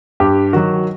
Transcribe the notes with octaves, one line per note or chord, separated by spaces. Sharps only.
G2 G4
D#3 F#3 F#4